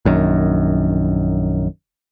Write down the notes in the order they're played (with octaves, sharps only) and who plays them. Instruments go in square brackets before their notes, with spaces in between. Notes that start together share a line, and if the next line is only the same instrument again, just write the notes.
[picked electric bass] A#1 F#2 D#3